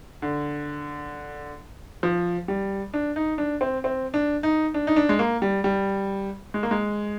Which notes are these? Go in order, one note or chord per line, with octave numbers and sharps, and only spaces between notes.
D3
F3
G3
D4
D#4
D4
C4
C4
D4
D#4
D4
D#4
D4
G#3
A#3
G3
G3
G#3
A#3
G#3